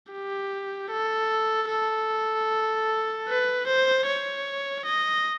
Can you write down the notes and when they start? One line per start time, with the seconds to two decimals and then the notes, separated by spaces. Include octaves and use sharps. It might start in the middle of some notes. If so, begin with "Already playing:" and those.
0.13 G4
0.91 A4
1.71 A4
3.28 B4
3.67 C5
4.07 C#5
4.86 D#5